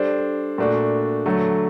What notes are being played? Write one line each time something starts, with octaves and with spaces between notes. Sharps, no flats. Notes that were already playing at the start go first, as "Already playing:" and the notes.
Already playing: G3 D4 A4 C5
A#2 A3 D4 F#4 A4
D3 F#3 A3